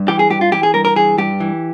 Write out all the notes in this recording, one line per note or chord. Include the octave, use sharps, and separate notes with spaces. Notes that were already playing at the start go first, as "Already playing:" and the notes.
Already playing: G2
E3 G4
G#4
G2 G4
F4
E3 G4
G#4
G2 A#4
A#4
E3 G#4
G2 G4
E3